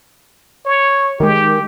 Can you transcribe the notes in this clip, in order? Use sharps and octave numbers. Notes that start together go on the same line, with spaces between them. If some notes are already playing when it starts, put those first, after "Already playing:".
C#5
D#3 G#3 G4